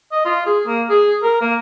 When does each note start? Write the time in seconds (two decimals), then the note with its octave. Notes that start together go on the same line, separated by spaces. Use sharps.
0.12 D#5
0.25 F4
0.46 G#4
0.67 A#3
0.90 G#4
1.22 A#4
1.41 A#3